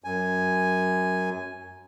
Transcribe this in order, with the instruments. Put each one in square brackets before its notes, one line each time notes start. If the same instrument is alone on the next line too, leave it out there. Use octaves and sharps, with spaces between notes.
[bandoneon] F#2 G#5